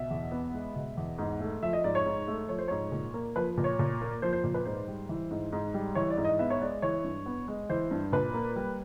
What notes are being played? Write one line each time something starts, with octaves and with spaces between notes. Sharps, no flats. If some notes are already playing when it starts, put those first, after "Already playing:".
Already playing: B2 E5
E2
B3
G#3
B2
E2
G#2
A3
F3 E5
D#5
G#2 D5
C#5
G#2
A3
F3 C#5
C5
G#2 C#5
A#2
A#3
F3 B4
A#2
C#5
A#2
A#3
F3 C5
C5
A#2
B4
G#2 C5
G3
E3
G#2
G#2
G3
E3 C#5
D5
G#2
D#5
B3 E5
C#5
G#3 D5
E3 C#5
G2
B3
G#3
E3 C5
G2
A#2 B4
A#3
G3